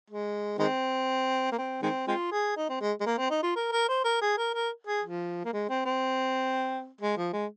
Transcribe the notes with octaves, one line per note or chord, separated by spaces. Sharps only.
G#3
D#3 G#3 C4
A#3
C4
D#3 G#3 C4
G#3 C4 F4
G#4
D#4
C4
G#3
G#3
A#3
C4
D#4
F4
A#4
A#4
C5
A#4
G#4
A#4
A#4
G#4
F3
A#3
G#3
C4
C4
G#3
F3
G#3